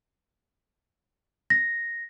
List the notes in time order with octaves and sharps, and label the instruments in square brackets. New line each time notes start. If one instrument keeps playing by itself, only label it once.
[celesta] A#6